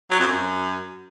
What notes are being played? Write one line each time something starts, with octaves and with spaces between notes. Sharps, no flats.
F#3
F2
F#2